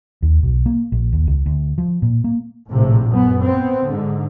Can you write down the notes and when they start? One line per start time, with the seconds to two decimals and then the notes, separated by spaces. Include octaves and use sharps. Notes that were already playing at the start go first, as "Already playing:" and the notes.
0.22 D#2
0.43 B1
0.66 A#3
0.92 A#1
1.13 D#2
1.27 C#2
1.46 D2
1.78 F3
2.02 A#2
2.24 A#3
2.71 A#1 A2 C3
3.09 F#2 B3
3.44 B3 C4
3.88 G#2 D3